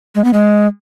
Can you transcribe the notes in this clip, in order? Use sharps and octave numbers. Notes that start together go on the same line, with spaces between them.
G#3
B3
G#3